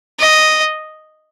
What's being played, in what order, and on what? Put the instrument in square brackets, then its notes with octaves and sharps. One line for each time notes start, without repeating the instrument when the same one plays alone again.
[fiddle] D#5